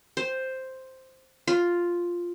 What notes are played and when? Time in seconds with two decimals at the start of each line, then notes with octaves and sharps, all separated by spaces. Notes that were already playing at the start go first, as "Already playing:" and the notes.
0.17 C5
1.48 F4